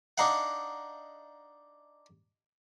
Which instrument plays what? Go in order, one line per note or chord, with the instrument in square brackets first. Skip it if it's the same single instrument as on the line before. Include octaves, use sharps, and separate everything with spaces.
[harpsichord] D4 D#4 F5 F#5